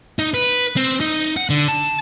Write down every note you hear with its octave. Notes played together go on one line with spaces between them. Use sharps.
D#4
B4
C4
D#4
F#5
D3
A5